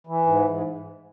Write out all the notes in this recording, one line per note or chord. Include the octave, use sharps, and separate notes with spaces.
E3
G#2
G#2